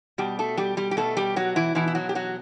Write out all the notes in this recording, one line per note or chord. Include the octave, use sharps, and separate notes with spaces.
B2 G3 G4
A3 A4
G3 G4
G3 G4
G4
B2 A3 A4
G3 G4
F#3 F#4
E3 E4
B2 E3 E4
E4
F#3 F#4
G4
F#3 F#4